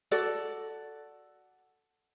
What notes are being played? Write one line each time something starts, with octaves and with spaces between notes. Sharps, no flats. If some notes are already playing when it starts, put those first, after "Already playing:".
F#4 A4 D5